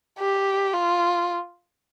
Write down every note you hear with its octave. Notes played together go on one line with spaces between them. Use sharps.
G4
F4